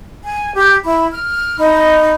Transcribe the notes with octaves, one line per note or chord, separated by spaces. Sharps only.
G#5
G4
E4 B5
F6
D#4 B5